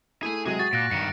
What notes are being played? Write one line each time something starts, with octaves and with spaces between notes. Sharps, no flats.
A3 E4 G#4 G#5
C3 F#3 G#3 G#4
F#4 A6
A#2 F#6 A#6 D7
G2 D#3 C#7